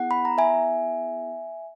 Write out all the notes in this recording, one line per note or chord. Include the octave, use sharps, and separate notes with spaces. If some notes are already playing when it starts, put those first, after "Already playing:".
Already playing: B3 E4 G#4 F#5
B5
A#5
E5 G#5